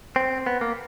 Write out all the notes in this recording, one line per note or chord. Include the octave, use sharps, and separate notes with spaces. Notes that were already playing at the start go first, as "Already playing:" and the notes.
C4
B3
A#3